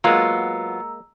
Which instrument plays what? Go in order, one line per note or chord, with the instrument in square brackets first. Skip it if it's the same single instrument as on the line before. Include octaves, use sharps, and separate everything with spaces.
[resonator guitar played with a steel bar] F#3 B3 F4 [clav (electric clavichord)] G#3 A#3 [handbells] A#5 E6